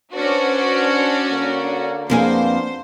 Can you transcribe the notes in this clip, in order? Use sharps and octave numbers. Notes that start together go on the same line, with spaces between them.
C#4 D4 F#4 B4 C5
D3 A#3
F2 A#3 B3 D4 G#4 C5